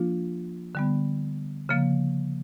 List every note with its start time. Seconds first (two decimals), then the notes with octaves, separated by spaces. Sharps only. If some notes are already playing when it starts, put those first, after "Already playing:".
Already playing: F3 A#3 D4 F4
0.75 D3 G3 B3
1.69 C#3 F3 A#3